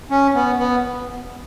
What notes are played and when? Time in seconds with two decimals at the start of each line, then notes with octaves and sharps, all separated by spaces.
0.10 C#4
0.34 B3
0.59 B3